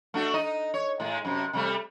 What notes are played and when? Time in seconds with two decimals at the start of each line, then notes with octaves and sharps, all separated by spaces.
0.14 A3 D4 F#4
0.34 D#4 D#5
0.74 C#5
1.00 A2 G#3
1.25 F#2 C3
1.53 C3 G3 A3